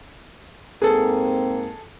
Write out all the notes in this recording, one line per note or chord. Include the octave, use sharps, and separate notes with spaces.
G#2 A#3 C4 G#4 A4